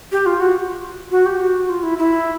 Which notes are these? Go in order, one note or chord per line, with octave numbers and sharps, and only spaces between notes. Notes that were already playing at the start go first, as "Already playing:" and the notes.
G4
F4
F#4
F#4
G4
F#4
F4
E4
E4